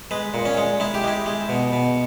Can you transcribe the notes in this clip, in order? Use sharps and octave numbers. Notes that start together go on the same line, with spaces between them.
G#3 B4
A#2
C#4
G#3
G#3 E4
G4
G#3 E4
G#3
B2
B2